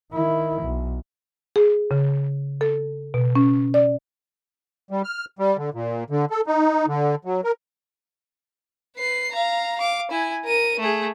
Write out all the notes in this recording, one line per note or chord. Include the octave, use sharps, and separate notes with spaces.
D#3 E4
B1
G#4
C#3
A4
B2
C#4
D5
G3
F6
G3
D3
A#2
D3
A4
D#4
D3
F#3
A#4
B4 C7
F5 A#5
F5 D6
E4 G#5
A#4 D#7
A3 G#4